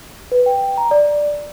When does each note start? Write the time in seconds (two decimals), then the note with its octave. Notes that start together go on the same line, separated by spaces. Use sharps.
0.32 B4
0.46 G5
0.77 A#5
0.91 D5